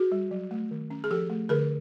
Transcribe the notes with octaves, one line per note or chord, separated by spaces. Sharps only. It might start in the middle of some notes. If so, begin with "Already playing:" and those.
Already playing: F#4 G#4
G3
F#3
A3
D#3
C#4
G#4
F3 G4 A4
A3
D3 G#4 A#4